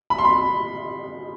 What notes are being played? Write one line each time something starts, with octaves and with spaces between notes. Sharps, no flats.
B5
C6
B5